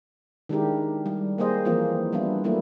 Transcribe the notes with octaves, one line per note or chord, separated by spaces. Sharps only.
D#3 G#3 D4 E4 G4 A#4
G3
A#3 G4 G#4 C5 D#5
E3 F3 A#3 C4 F4
G3 B3 D4 E4 F4
F#3 A3 A#3 E4